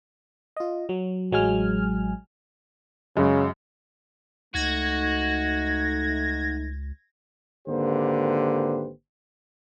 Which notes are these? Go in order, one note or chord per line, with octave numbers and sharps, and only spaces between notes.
F4 D#5
F#3
A1 F#3 G#3 G#5 F6
F#2 C#3 G#3
C#2 A3 D#4 F#4 G#6 A#6
G#1 D3 A#3 G4 B4 C5